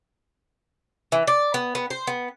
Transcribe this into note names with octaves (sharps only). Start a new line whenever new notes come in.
E3
D5
B3
B3
C5
B3